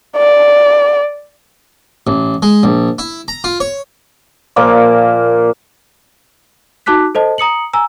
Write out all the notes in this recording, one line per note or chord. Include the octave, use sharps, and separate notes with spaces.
D5
A1
G#3
A#1
E4
A#5
F4
C#5
A#2 F3 A#3 D6
D#4 F#4 A5 D6 F#6 B6
A4 C5 D#5 A5
A#5 D#6 C#7 F#7
G#5 A#5 E6